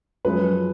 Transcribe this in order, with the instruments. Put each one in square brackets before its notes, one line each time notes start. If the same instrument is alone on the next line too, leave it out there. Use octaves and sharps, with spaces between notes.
[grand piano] F#2 F3 G#3 B4